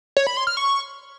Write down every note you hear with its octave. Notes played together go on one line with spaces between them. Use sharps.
C#5
B5
C6
F6
C#6